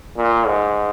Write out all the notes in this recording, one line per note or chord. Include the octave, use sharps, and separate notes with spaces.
A#2
G#2